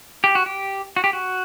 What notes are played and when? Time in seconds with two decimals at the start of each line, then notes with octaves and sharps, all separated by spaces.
0.24 G4
0.35 F#4
0.46 G4
0.96 F#4
1.04 G4
1.13 F#4